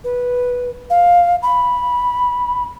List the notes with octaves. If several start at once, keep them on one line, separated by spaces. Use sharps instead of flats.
B4
F5
B5